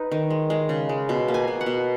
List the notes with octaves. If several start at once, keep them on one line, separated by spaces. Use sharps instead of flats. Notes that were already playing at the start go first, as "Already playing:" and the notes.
Already playing: D#4 B4
D#3
G#3
G#3
C#3
G#3
B2
A#3
G#5
B2
F#5
B2